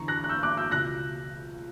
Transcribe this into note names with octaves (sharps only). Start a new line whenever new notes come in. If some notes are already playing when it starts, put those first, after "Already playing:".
Already playing: E2 D3 A#5 C#6
F#6 A#6
F#6
E6 G6
D6 F#6
E6 G6
C#2 B2 F#6 A#6